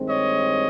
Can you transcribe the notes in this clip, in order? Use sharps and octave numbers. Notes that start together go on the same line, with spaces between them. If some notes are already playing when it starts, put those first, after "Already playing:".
Already playing: G2 D#3 G#3 C4
C#5 D#5